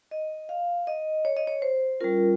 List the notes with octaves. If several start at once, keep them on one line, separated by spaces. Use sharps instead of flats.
D#5
F5
D#5
C#5
D#5
C#5
C5
G3 C#4 F4 A#4